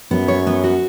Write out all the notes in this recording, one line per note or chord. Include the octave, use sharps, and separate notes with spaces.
F#2 B3
C#5
B3
F#4